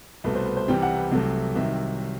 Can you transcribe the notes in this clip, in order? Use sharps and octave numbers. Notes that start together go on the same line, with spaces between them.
C2 B2 A3 B4
C5
B4
C5
C2 C3 E3 G3 G5
F#5
B4
C2 C3 F#3 A3
C2 C3 D#3 F#3 E5